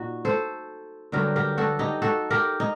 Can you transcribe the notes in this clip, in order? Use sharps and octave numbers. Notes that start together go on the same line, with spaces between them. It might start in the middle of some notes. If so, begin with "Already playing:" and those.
Already playing: A#2 D#4 F#4
A4 C5
G2 D3 F#3 G4 A#4
G4 A#4
F#4 A4
D#4 G4
F#4 A4
G4 A#4
D#4